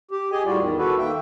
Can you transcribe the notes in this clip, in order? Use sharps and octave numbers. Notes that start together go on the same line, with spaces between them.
G4
G4 G#4 D#5 G#5
A2 G3 F4 F#4 D5
E2 D#3
F#4 A4 B4
D#3 A#3 E5 G5